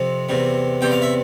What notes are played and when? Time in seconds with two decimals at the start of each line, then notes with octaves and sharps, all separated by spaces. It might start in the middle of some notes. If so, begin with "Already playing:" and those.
Already playing: F2 C3
0.29 E2 C3 G3
0.81 E2 C3 G3 G5
0.92 F5
1.02 E5